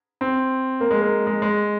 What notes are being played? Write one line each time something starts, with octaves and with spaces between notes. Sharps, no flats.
C4
A#3
G#3
A#3
G#3
G#3